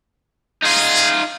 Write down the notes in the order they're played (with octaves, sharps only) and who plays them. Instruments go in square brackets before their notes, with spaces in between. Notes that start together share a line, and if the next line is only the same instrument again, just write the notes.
[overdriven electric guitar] D#4 F4 [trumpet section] G#4